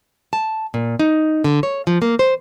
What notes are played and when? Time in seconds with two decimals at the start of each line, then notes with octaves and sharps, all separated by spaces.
0.33 A5
0.74 A#2
1.00 D#4
1.44 D3
1.63 C#5
1.87 F3
2.02 A#3
2.19 C5